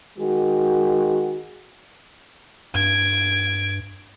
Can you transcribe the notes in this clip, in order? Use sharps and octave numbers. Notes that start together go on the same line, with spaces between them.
D#3 G#3 F#4
G2 G#6 D7